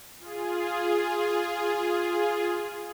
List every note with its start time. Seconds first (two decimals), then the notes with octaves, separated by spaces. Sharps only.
0.19 F4 G#4